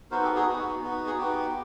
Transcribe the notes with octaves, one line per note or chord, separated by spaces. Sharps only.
B3 D#4 F#4 A#4 C5
G4 A4
F#4 G#4
B3 D#4 F#4
B3 D#4 F#4
G#4
B3 D#4 F#4 G4